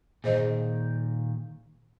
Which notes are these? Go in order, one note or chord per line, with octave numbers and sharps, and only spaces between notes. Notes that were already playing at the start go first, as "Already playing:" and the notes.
A#2 D#3 G#4 C5 D#5